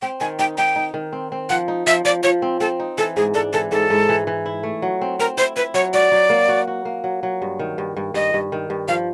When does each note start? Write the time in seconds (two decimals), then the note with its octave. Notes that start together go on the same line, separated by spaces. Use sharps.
0.02 C4 G5
0.20 D#3 G#5
0.39 D#4 G5
0.58 D#4 G5
0.76 D#4
0.94 D#3
1.13 C4
1.32 C4
1.50 F3 F#5
1.68 D#4
1.87 F3 E5
2.05 F3 D5
2.23 F3 C#5
2.42 C4
2.61 C4 A4
2.80 D#4
2.98 E3 A4
3.17 G#2 G#4
3.34 D4 A4
3.53 E3 A4
3.72 G#2 A4
3.90 G#2
4.09 E3
4.27 E3
4.46 E4
4.63 A3
4.82 F#3
5.01 C4
5.19 C4 A#4
5.37 E4 C5
5.57 E4 B4
5.74 F#3 C#5
5.93 F#4 D5
6.12 F#3
6.30 A#3
6.49 F#4
6.67 F#4
6.85 A#3
7.04 F#3
7.23 F#3
7.42 G2
7.59 D#3
7.78 G2
7.97 G2
8.14 G2 D#5
8.34 G2
8.52 D#3
8.70 G2
8.88 F3 F5